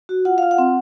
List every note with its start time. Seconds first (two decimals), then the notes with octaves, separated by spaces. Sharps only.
0.09 F#4
0.25 F4 F#5
0.38 F4 F5
0.51 F#5
0.58 C4